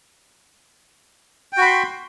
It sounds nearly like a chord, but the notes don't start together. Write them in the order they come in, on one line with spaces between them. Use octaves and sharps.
G5 F#4 B5 C6